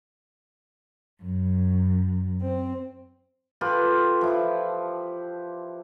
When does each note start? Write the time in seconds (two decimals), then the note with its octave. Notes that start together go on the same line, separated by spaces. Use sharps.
1.22 F#2
2.40 C4
3.61 F4 G4 A4 B4
4.21 F3 E4